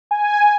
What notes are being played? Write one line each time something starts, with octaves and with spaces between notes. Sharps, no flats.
G#5